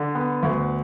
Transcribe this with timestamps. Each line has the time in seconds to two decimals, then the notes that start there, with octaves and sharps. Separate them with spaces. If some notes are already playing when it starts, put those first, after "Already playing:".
Already playing: D3
0.15 B3
0.43 D2